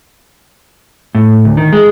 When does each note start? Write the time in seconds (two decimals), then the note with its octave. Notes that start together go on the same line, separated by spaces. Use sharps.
1.15 A2
1.45 D2
1.57 D#3
1.73 G#3